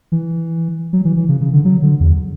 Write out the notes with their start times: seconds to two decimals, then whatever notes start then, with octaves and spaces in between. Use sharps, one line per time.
0.12 E3
0.93 F#3
1.05 E3
1.16 E3
1.29 C#3
1.41 C#3
1.53 D3
1.65 F#3
1.82 D3
2.00 E2